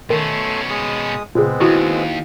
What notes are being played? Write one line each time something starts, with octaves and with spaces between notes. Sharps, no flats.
B2 D#3 A3 C#4 C6
G#3 D#6
A#2 C#3 G#3 B3 C4
D#2 E4 F#4